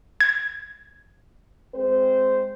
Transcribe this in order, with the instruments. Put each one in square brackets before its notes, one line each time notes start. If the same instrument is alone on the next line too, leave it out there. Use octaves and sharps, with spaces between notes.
[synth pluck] G#6
[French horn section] G#3 C4 C5